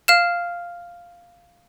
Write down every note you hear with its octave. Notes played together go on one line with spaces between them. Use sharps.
F5 F6 E7